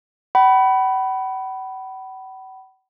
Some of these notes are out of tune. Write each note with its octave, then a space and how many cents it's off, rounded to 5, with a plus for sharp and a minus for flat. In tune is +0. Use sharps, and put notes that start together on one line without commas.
F#5 +45 B5 +0